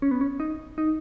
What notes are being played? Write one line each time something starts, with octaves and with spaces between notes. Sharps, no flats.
C#4
B3
C#4
D#4
D#4